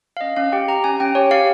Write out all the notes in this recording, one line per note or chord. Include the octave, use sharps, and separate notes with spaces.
F5
C#4 D#5
C#4 F5
G4 G5
G4 A#5
C#4 G#5
C#4 G5
G4 C#5
G4 F5